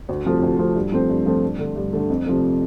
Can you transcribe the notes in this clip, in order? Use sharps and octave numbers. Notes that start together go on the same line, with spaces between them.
D2
C3 F3 A3
D2
C3 F3 A3
G2
F3 A3 C4
G2
F3 A3 C4
G2
D3 A3
G2
D3 A3
F2
C3 F3 A3